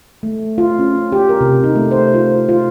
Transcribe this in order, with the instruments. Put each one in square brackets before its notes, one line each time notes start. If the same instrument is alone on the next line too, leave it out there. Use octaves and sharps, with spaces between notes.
[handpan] A3
F4
C#4
G4
A#4
C3
D#4
A3
C5
F4
F4